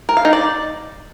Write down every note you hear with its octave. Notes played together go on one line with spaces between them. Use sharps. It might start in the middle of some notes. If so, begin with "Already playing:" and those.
A#4
F5
D#4
D5